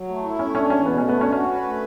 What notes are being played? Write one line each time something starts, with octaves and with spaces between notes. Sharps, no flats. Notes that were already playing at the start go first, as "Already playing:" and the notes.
Already playing: F#3
A3
E4
A3 C#4
C#4 D4
E2 C#4
B2 B3
A3 C#4
B3
C#4 D4
C#4 F#4
B4
A3